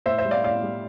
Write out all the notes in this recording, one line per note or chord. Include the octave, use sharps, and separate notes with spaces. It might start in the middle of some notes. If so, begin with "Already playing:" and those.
A2 C5 E5
C5 E5
G3
D5 F5
A2 D5 F5
G3